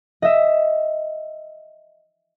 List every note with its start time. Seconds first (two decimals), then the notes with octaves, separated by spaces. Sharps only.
0.22 D#5 E5